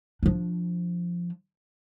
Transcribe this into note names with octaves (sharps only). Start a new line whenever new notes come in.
F3 D4